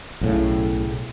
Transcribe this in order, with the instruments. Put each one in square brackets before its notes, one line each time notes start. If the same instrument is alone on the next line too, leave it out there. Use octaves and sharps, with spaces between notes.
[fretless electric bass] B1 A2 C#3